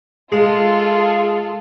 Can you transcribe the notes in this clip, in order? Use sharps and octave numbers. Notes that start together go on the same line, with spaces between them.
G#3 F4 G#4 A4